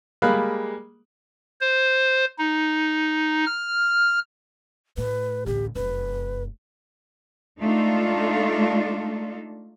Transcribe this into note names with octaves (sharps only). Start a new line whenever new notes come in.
G3 G#3 A#3 F5 B5 F#6
C5
D#4
F6
A2 B4
A1 D2 G4
F1 F#2 B4
G#3 A3 D4 D#4 F4 A4